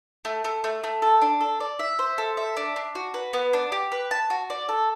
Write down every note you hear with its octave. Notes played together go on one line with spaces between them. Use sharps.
A3
A3
A3
A3
A4
D4
A4
D5
E5
C5
A4
E5
D4
D4
F#4
B4
B3
D4
G4
B4
A5
F#4
D5
A4